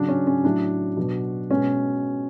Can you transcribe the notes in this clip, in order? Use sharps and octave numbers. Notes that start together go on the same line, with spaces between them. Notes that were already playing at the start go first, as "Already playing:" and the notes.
Already playing: C#3 F#3 D4
C#4
C#4
A2 F#3 D4
B2 F#3
B2 G#3 C#4